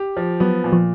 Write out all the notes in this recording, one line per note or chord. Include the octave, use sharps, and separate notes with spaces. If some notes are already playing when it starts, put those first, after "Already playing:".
Already playing: G4
F3
F#3 B3
A#2
F3